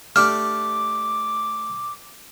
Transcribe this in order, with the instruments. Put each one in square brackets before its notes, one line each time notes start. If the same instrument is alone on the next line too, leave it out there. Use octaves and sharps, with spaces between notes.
[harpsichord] A3 D4 G4 [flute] D6 [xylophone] F6